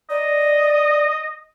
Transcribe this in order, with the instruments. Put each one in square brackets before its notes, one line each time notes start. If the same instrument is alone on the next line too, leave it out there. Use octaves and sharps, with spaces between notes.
[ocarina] D5 [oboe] D#5